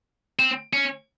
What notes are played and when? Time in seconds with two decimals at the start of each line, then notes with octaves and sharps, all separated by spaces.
0.39 C4
0.73 C#4